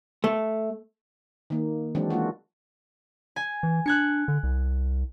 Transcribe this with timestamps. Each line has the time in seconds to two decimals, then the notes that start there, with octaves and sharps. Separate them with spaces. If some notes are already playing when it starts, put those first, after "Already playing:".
0.24 A3
1.50 D#3 A#3
1.95 E3 F#3 G#3 C4 D4
2.10 G#3 A#3 F4 F#4
3.36 G#5
3.63 E3
3.86 D4 F#6 G#6 C#7
4.28 D3
4.43 C2